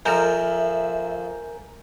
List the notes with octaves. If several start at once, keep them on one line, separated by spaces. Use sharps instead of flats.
F2 F3 A#4 E5 G#5 A#5 G6